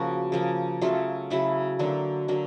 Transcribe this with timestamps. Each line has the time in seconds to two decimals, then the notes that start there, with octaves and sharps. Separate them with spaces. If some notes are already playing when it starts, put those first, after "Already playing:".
Already playing: C#3 F3 A#3 F#4
0.32 C#3 F3 A#3
0.81 C#3 F#3 A3 F4
1.30 C#3 F#3 A3 E4
1.79 D3 F#3 A#3
2.28 D3 F#3 A#3